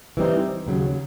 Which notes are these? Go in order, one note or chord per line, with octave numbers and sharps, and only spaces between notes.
E3 G3 C4 D#4
D#2 C#3 F#3